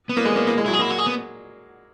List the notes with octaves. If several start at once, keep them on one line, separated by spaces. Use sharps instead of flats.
B3
A#3
G#3
A#3
A#3
G#3
F#3 E4
G#4
A#3 E4
F#4
G#4
B3